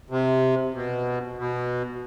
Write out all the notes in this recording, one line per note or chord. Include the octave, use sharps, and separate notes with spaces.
C3
B2
B2